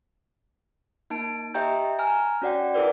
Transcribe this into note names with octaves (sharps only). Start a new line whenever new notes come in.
A#3 D#4 A5 D7
G4 D#5 E5 G5 A#5 G6
G#5 A#5 F6
C#4 F#4 D5 F#5 G5
E4 G#4 A#4 B4 D5